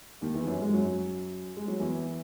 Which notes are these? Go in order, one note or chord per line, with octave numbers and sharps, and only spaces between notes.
D#2 D#3
E2 E3
F#2 F#3
G#2 G#3
F#2 F#3
G#3
F#3
E2 E3